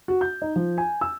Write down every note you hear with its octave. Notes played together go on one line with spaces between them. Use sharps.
F#4
G6
D#4
F3
G#5
E6